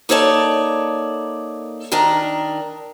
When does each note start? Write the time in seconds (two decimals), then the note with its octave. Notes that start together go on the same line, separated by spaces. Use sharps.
0.09 A#3 D#4 A4 C#5 D5 A5
1.92 D#3 D4 A#4 A#5